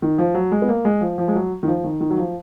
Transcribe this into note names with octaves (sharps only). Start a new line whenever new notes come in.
D#3
F3
F#3
G#3
B3
A#3
G#3
F3
F3
G#3
F#3
D#3
F3
D#3
D#3
F#3
F3